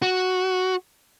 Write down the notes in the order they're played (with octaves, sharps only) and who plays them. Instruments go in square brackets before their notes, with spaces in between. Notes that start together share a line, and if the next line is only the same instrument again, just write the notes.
[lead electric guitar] F#4